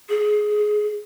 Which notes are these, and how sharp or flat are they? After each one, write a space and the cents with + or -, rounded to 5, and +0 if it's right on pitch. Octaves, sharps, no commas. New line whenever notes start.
G#4 +15